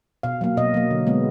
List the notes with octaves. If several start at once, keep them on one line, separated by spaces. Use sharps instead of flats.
B2 F5
F#3 A#3
B2 D#5
F#3 A#3
D3
G#3 B3